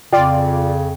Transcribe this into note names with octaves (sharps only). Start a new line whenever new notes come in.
F2 C#3 F4 D5 G5